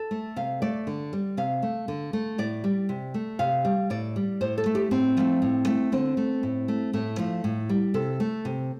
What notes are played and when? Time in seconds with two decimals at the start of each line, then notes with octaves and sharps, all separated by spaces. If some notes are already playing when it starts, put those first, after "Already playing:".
Already playing: A4
0.11 A3
0.36 C3 F5
0.62 A3 D5
0.87 D3
1.13 G3
1.37 C3 F5
1.62 A3
1.88 D3
2.13 A3
2.38 A2 D5
2.64 G3
2.89 C3
3.14 A3
3.39 C3 F5
3.65 G3
3.90 A2 D5
4.16 G3
4.41 A2 C5
4.58 A4
4.66 A3
4.75 G4
4.91 A2 C4
5.17 F3 A3
5.42 A2
5.67 A3
5.92 D3 C4
6.17 A3
6.43 A2
6.68 A3
6.93 A2 A3
7.18 F3 A3
7.44 A2
7.69 G3
7.94 C3 A4
8.20 A3
8.45 C3